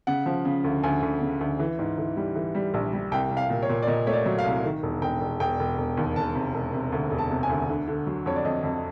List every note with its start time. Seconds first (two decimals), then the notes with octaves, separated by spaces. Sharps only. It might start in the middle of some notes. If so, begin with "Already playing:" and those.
0.07 C#3 F#5
0.26 F3
0.45 C#3
0.64 D2
0.83 D2 G#5
1.02 D2
1.22 C#3
1.40 D2
1.59 E3
1.79 G#2
1.98 E3
2.17 G3
2.35 E3
2.55 G3
2.74 A#1
2.93 G3
3.12 C2 G5
3.31 C2
3.37 F5
3.50 A#2
3.63 C#5
3.69 A#2
3.82 D5
3.87 A#2 D#5
4.07 A3 C#5
4.13 D5
4.26 F#3
4.39 F5
4.45 C2
4.64 D#3
4.83 E1
5.02 E1 G5
5.21 E1
5.40 E1 G5
5.60 E1
5.78 E1
5.97 D#2
6.16 E1 A5
6.35 C3
6.54 E1
6.73 C3
6.92 D2
7.11 E1
7.18 A5
7.31 C3
7.43 G#5
7.49 D2
7.69 D3
7.87 D3
8.07 F#3
8.26 F2 C#5
8.36 D5
8.45 F2 D#5
8.63 F2